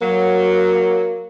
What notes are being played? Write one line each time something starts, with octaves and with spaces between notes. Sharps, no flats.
F#3 A#3